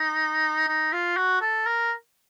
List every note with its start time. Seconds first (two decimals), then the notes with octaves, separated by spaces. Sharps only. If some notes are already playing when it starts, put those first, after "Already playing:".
Already playing: D#4
0.68 D#4
0.93 F4
1.17 F#4
1.41 A4
1.66 A#4